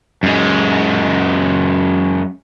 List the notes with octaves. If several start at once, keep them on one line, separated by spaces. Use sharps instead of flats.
F#2 G#3